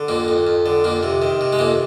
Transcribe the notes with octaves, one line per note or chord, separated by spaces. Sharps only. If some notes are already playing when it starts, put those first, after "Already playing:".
Already playing: D3
F2 A#3
F2
F2
D3
F2 A#3
C3
D#3
C3
G#3
F2 A#3